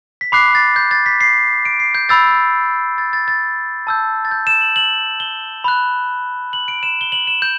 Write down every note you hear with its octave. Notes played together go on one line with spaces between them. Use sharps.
B6
B5 D6 F#6 C7
A6
G6
A6
B6
C7
D7
C7
G6
B5 E6 G6 A6
A6
A6
A6
A5 E6 G6
A6
G6
E7
F#7
F#7
G7
B5 F#6
F#7
D7
E7
G7
F#7
E7
G6